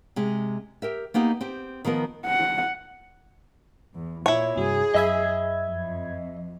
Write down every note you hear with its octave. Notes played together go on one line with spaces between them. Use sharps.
C3 G#3
G4 A#4 E5
A#3 B3 D#4 G4
C4 G4
D#3 F3 B3 A#4
F#5
E2
A#2 E4 C#5
G2 C3 F#4 G#4
F#2 D#5 E5 B5 G#6
F2